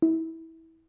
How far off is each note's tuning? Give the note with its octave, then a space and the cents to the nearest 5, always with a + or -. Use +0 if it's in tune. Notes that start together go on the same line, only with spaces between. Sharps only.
E4 -20